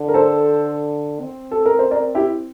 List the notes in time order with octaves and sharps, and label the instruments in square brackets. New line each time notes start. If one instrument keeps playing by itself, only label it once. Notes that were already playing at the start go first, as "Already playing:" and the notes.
Already playing: [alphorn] D3
[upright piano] A#4
A4 C5
[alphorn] C4
[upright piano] A4
A#4
C5
A#4 D5
E4 G4